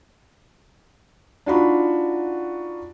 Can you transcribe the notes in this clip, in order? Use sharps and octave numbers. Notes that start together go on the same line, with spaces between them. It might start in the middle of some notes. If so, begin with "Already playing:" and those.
D4 D#4 F4 F#4 A#5 B5